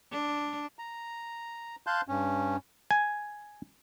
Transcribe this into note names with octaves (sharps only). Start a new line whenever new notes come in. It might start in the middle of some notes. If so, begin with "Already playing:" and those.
D4
A#5
F5 A5 C6 F#6 G6
G2 C#4
G#5